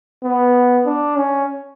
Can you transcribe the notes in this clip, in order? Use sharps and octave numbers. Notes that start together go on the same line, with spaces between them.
B3
D4
C#4